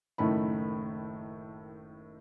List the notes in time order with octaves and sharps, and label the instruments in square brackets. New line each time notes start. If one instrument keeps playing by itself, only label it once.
[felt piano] F#1 A2 D#3 A3 B5